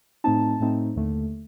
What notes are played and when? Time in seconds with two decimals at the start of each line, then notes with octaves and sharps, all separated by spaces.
0.24 A2 A3 C4 D#4 A5
0.60 A2 A3 C4 D#4
0.96 D#2 D3 A3